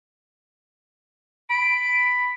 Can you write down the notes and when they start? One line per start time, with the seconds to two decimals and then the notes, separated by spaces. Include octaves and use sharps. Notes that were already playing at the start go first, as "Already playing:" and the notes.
1.50 B5 D7